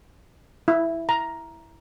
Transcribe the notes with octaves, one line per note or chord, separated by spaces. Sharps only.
E4
A#5